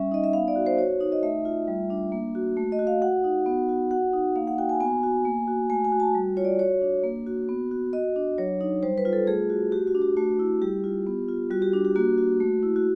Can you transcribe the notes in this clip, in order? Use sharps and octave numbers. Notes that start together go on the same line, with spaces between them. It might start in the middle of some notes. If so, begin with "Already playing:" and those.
Already playing: G3 C#4 E5
D#4 D#5
E5
B3 F5
D5
F#4
C5
F#4 C#5
D#4
D#5
A3 E5
F4
G3
D4
A#3
F#4
A3
D#5
F#4
F5
F#4 F#5
D#4
B3
F#4
F#4 F#5
D#4
A#3 F5
F#5
F#4 G5
G#5
B3 G#5
F#4
A#3
F#4
A3 G#5
G#5
F#4
A5
G3
F4 C#5
D5
F#4 C#5
D4
A#3
F#4
B3
F#4
F#4 D#5
D4
F#3 C#5
D#4
G3 C5
B4
F4
A4
A3 G#4
F#4
F#4 G4
F#4
D4
G4
A3 F#4
E4
G3 G4
F4
B3
F4
G3 F#4
G4
D4
G4
A#3 F#4
F#4
A3
E4
F#4